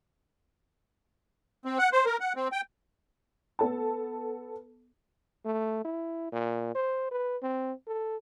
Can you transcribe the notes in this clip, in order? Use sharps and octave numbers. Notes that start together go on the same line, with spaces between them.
C4
F#5
C5
A#4
F#5
C4
G5
B3 A4 A5
A3
E4
A#2
C5
B4
C4
A4